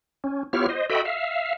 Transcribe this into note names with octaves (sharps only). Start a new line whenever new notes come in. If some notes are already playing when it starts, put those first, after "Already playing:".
C#4
B3 E4 F4 G4 C#5 F6
C5 D#5
F#4 A4 D#5 E5 G5 B5
E5 F5